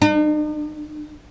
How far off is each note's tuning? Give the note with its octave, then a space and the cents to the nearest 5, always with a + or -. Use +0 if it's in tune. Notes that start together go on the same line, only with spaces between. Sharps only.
D#4 -45